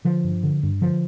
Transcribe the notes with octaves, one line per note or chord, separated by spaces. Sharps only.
D3 F3
G2
D3
G2
D3 F3